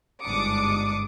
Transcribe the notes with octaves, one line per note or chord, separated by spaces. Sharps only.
G1 G#2 D4 D6 D#6 C#7